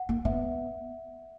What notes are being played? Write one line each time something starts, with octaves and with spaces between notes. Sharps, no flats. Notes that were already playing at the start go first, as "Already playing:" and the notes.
Already playing: F#5
A#3
B3 E5